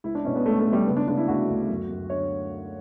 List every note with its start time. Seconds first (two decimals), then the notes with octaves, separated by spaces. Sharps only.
0.04 C#2 E4
0.15 D4
0.25 B2 C#4
0.35 B3
0.45 C#2 A3
0.60 A3
0.66 C#2
0.73 G3
0.87 C#3 B3
0.97 D4
1.07 C#3 D4
1.17 E4
1.28 D2 F#4
1.48 D2
1.69 F#2
1.89 F#2
2.10 D3 C#5